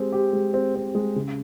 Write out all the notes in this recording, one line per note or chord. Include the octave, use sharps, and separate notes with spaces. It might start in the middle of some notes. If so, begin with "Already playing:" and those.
Already playing: G#3 C4 G4
G4
G#3
C4
C4
G#3
C#3